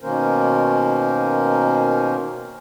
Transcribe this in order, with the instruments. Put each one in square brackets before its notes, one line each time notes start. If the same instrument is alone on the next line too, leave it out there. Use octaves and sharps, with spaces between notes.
[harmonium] B2 D#3 A#3 C#4 A#4 C5